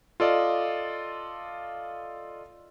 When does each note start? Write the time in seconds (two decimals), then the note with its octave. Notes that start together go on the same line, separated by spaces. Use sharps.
0.20 F4 A4 D5 D#5 F5